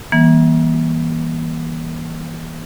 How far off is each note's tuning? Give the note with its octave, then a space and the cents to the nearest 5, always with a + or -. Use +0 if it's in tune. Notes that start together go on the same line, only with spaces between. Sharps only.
E3 -20 G3 +0 A#3 +35